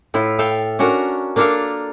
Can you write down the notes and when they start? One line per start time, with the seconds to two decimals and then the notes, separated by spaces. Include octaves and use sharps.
0.14 A2 E4 F4
0.39 A4 E5 F5 G5
0.79 C#4 D4 F#4 A#4
1.36 A#3 D4 F4 A4 A#4 F5